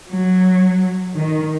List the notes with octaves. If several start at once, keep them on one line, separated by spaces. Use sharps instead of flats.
F#3
D#3